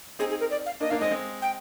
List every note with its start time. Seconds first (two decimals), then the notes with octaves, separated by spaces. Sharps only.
0.19 C4 D#4 G#4
0.30 G#4
0.40 A#4
0.51 D5
0.66 F5
0.80 A#3 D4 D#5
0.90 A#3 D4 F5
1.00 G#3 C4 D#5
1.11 G#3 C4
1.42 G5